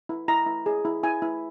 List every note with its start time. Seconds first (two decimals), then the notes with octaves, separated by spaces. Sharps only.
0.09 E4
0.28 E4 A#5
0.46 E4
0.66 G#4
0.85 E4
1.03 E4 G#5
1.22 E4